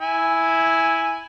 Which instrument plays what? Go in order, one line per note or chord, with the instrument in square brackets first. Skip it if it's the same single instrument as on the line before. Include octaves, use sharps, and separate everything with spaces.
[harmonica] E4 G#5